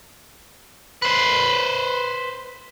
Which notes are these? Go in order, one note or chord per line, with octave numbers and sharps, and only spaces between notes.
B4 C5